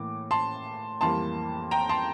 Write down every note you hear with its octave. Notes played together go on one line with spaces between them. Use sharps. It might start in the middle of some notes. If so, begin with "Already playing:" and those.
Already playing: A2 E3 A#3 D6
A5 C6
F2 E3 G3 A#3 A5 C6
G5 A#5
A5 C6